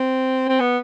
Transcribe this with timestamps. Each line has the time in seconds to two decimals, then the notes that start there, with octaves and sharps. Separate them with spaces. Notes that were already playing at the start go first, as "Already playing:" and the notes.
Already playing: C4
0.48 C4
0.60 B3